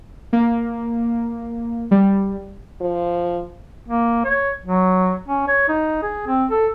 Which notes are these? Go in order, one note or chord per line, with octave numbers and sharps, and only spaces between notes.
A#3
G3
F3
A#3
C#5
F#3
C#4
C#5
D#4
G#4
C4
A4